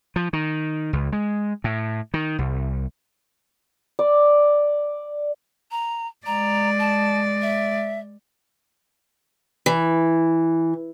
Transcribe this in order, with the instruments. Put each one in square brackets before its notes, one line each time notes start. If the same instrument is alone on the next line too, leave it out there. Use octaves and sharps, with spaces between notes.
[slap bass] F3
D#3
C#2
G#3
A2
D#3
C2
[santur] D5
[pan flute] A#5
[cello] G#3 D5 [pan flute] A#5
[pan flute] A5
E5
[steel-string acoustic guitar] E3